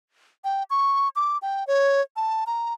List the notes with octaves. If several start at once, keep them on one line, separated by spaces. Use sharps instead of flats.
G5
C#6
D6
G5
C#5
A5
A#5